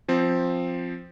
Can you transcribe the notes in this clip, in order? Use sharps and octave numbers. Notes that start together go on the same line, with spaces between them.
F3 C4